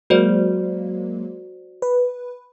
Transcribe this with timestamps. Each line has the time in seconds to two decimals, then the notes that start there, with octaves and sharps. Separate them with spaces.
0.10 F#3 G#3 A#3 F#4 C5 D5
1.82 B4